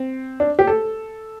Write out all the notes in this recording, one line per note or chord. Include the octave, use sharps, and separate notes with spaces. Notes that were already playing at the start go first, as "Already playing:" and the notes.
Already playing: C4
D4
G4
A4